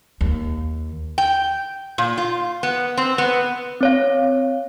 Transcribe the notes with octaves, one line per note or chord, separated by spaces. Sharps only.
D#2
G5
A#2
F4
B3
C4
B3
C4 C#5 F5